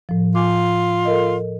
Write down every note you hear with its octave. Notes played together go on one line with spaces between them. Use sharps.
A2 F3
F4 G#5 D6
A4 A#4 D#5